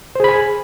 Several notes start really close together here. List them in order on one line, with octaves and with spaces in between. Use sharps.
C5 G#4 B5 G#5